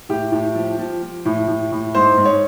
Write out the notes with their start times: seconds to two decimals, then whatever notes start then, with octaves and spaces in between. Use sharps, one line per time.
0.09 A2 G4
0.32 A2
0.55 F3
0.78 F3
1.02 F3
1.25 A2
1.47 A2
1.71 A2
1.95 G#2 C5
2.18 G#2
2.25 C#5